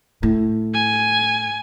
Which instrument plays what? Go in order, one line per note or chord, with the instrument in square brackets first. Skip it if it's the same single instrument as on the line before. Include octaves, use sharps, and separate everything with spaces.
[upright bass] A2
[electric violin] G#5